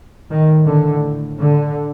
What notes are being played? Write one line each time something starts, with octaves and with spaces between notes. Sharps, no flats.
A2 D#3
D3
D3